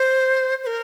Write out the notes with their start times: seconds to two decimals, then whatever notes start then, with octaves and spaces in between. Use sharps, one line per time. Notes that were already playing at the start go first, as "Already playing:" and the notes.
Already playing: C5
0.63 C5
0.67 A#4